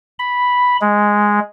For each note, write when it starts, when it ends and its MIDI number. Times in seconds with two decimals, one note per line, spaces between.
0.19 0.77 83
0.81 1.40 56